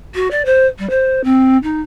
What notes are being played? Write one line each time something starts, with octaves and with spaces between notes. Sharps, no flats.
F#4
D5
C5
G3
C5
C4
D#4